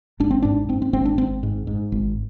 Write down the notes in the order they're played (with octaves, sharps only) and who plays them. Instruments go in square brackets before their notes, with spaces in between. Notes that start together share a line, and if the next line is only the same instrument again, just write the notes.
[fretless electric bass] G#1 D4
C4
G#2 D4
G#2 C4
C4
G#1 C4
D4
G#1 C4
G#2
G#2
G#1